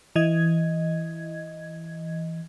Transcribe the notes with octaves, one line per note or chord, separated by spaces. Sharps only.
E3 D#5 G#6